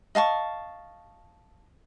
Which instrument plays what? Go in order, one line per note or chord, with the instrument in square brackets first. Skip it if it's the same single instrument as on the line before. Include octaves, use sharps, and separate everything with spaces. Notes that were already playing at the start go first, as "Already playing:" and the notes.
[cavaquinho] D#5 F5 A5 C#6